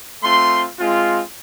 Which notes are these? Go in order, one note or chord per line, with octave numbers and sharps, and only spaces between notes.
A3 C4 F4 C6
G#3 C4 F4